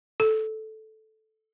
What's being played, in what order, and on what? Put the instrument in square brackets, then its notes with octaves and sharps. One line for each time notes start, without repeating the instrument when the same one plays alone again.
[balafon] A4